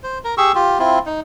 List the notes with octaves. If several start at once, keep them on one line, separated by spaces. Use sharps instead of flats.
C5
A#4
G4 G#4 C#6 E6
F4 G4
C4 E4 F4
D#4